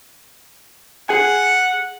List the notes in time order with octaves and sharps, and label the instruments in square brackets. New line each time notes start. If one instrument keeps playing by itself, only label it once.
[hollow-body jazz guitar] G#4 G#5 [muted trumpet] F#5